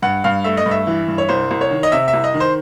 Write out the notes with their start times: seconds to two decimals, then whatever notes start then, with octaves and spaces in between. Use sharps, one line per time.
0.02 G2 F#5
0.24 G2 F5
0.44 A3 E5
0.57 D#5
0.66 G2
0.71 E5
0.87 E3
1.08 G2
1.18 C#5
1.29 C2 C5
1.51 C2
1.61 C#5
1.71 D#3
1.83 D#5
1.92 C3 E5
2.08 E5
2.13 C2
2.24 D#5
2.34 D#3
2.40 C5